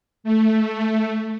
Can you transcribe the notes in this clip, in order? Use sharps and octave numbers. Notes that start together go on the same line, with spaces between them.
A3